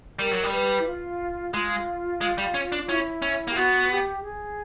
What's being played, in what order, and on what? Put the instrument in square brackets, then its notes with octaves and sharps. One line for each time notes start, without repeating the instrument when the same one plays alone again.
[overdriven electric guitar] G3 [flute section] A#4
[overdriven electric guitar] F#3
G3
[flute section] B4
E4
F4
[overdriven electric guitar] G#3 [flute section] F4
[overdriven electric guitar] G#3
G3
C#4
D4
[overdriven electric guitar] C#4 [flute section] E4
[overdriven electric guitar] C#4
[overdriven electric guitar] A#3 [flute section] G4
[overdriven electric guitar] B3 [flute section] F#4
[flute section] G4
G#4